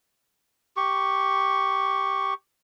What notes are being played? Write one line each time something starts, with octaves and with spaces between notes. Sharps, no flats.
G4 C#6